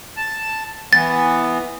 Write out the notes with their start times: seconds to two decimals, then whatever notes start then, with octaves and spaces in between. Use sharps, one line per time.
0.17 A5
0.93 E3 B3 A6